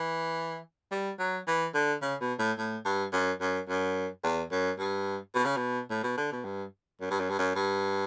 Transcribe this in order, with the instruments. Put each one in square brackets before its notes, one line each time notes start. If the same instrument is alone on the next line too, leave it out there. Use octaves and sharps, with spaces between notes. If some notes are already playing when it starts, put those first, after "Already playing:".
Already playing: [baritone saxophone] E3
G3
F#3
E3
D3
C#3
B2
A2
A2
G2
F#2
F#2
F#2
E2
F#2
G2
B2
C#3
B2
A2
B2
D3
B2
G2
F#2
G2
F#2
G2
F#2
G2